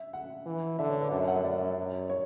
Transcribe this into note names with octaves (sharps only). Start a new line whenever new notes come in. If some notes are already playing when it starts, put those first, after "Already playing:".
Already playing: E5
F#5
E3
D3 E5
C#5
B4
F#2 D5
E5
F#5
E5
F#2 D5
F#2
C#5